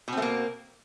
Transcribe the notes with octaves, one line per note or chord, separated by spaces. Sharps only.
B2 A3 A#3 C4